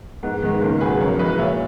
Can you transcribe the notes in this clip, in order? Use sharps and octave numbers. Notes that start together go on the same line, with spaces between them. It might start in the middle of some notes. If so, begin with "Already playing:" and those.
G#2 B3
D#3 G#3 B3
C#2 A#3 C#4
B2 F#3 G#4 B4
F#2 A#4 C#5
E3 G#3 B4 D#5
A#2 C#5 E5